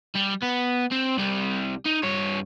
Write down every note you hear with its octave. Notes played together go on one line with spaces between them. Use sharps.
G3
B3
C4
C2 G3
D#4
G2 C#5